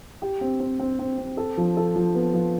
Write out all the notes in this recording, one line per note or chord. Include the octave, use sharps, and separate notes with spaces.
G4
C4
C4
C4
C4
C4
A4
F3
A4
F3
B3
F3